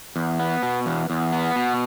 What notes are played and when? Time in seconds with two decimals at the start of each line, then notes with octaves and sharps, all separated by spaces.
0.16 E2
0.39 B3
0.63 B2
0.86 E2
1.10 E2
1.33 B3
1.56 B2